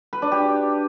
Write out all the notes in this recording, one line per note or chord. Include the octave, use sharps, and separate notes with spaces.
B4
D4
G4